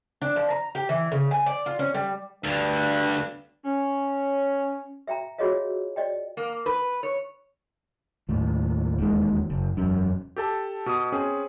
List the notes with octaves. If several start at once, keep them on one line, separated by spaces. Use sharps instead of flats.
D4
F3
A#5
G4
E3
C#3
G#5
D5
F4
C#4
G3
D2 G2 D3
C#4
E5 G5 A#5
F4 F#4 G#4 C#5 D#5 F5
D5 D#5 G5
A#3
B4
C#5
D#2 A2
E1 D#2 G#3
F#1
E1 F#2
G4 A4 A5
B2 D#6
C4 C#4 G#4